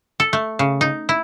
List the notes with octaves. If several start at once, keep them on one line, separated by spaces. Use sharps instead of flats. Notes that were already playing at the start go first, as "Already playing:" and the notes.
A4
A3
C#3
D#4
E4